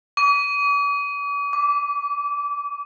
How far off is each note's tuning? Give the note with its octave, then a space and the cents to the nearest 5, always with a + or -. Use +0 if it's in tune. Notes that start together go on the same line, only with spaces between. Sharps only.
D6 -45
D6 -25